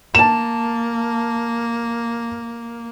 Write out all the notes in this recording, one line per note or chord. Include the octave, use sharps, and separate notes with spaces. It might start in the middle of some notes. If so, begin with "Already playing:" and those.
A#3 A5 E7